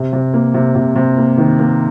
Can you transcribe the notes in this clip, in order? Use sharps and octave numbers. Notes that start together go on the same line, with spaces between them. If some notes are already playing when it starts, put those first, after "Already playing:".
Already playing: C3
C3
A#3
C3
C3
C3
A#3
D#3
A#3